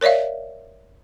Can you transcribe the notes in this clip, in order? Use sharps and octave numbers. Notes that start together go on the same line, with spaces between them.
A#4 C#5 D5 E5 F5